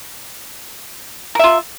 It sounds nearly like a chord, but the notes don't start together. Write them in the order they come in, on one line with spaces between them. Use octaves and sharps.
A#4 E5 F4